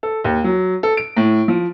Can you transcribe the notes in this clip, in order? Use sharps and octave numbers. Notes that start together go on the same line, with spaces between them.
A4
D#2
F#3
A4
D7
A2
F3